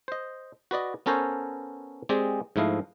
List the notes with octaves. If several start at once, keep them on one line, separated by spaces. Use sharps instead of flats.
C5 D#5
F#4 B4 D5 D#5
B3 C#4 A4 A#4 C5 C#5
G#3 C4 G4 G#4 D5 D#5
G#2 F3 A3 E4 D#5 F5